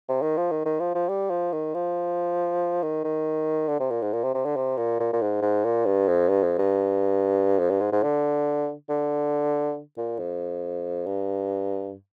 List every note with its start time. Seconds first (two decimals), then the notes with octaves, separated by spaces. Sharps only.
0.08 C3
0.22 D#3
0.37 F3
0.51 D#3
0.66 D#3
0.80 F3
0.95 F3
1.09 G3
1.30 F3
1.53 D#3
1.74 F3
2.83 D#3
3.04 D#3
3.69 D3
3.80 C3
3.91 A#2
4.02 G#2
4.13 A#2
4.24 C3
4.35 C3
4.46 D3
4.56 C3
4.78 A#2
5.00 A#2
5.13 A#2
5.22 G#2
5.42 G#2
5.64 A#2
5.86 G2
6.08 F2
6.29 G2
6.43 F2
6.59 G2
7.59 F2
7.70 G2
7.81 G#2
7.92 G#2
8.03 D3
8.89 D3
9.98 A#2
10.19 F2
11.06 G2